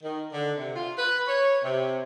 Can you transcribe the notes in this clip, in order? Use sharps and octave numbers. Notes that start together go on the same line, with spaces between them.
D#3
D3
C3
F4
B4
C#5
C3